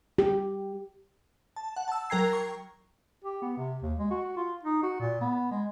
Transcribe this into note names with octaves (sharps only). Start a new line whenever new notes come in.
G4
A5
F#5
A5 E6
F#3 A#4 G5 A#5 G#6 C7
C#6
G4
B3
C3
D#2
G#3
F#4
F4
D#4
F#4
A#2
B3
G#3